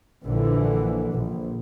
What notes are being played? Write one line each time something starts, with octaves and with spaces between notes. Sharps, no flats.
A#1 D3 E3
A#1